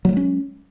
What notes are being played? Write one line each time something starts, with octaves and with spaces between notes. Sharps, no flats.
F#3 G#3 A3 C#4